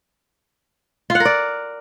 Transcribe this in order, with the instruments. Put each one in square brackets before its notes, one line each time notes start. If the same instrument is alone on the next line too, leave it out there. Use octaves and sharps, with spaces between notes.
[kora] F4
F#5
A#4
D5